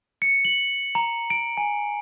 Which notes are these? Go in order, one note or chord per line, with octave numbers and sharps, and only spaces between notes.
C#7
F#7
A#5
D7
G#5